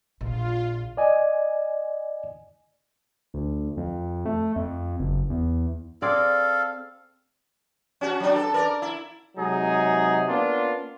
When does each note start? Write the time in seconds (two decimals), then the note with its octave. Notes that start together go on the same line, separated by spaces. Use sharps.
0.21 A#1 F4
0.97 D5 D#5 G#5
3.34 D2
3.77 F2
4.26 A3
4.56 F2
5.00 F#1
5.30 E2
6.02 C4 G#4 A4 D5 F5
8.01 C#4 F#4
8.20 F#3 D4
8.36 A4
8.54 A#4 D5
8.82 E4
9.38 C3 F#3 G#3 D#4 G#4
10.29 A#3 B3 C#4 D4 F4